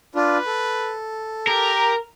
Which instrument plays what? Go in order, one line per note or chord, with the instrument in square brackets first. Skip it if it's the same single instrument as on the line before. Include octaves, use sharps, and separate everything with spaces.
[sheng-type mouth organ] D4 F4 [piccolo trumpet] B4
[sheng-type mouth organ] A4
[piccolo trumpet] G4 [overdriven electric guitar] A#4